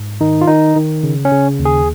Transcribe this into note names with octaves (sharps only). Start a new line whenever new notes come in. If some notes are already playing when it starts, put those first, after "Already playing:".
Already playing: G#2
D#3 D#4
F4
D#3 D#4
D#3
C#3
C#4
C#3
D#2
G#4